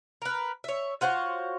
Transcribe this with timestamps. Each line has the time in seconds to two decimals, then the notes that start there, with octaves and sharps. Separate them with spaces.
0.22 A#4 B4
0.64 C#5 E5
1.01 F4 F#4 C5 C#5